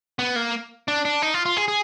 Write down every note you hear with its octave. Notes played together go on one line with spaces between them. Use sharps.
B3
A#3
D4
D4
D#4
F4
F4
G#4
G#4